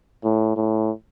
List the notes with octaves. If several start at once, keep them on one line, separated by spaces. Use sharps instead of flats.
A2
A2